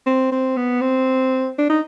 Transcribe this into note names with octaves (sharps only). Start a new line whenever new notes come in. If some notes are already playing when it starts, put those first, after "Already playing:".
C4
C4
B3
C4
D4
D#4